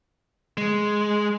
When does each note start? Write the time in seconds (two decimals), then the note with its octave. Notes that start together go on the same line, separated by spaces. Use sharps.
0.57 G#3